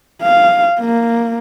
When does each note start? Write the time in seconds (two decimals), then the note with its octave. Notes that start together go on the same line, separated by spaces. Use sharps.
0.23 F5
0.80 A#3